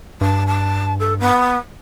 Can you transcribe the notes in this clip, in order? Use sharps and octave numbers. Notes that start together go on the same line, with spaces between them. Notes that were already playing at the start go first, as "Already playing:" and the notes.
G2 A5
A5
A4
B3